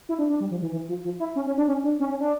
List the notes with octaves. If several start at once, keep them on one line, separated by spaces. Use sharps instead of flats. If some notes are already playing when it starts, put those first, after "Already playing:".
E4
D4
D4
G3
F3
E3
E3
F3
F3
E4
C#4
C#4
D4
C#4
D4
C#4
C#4
D4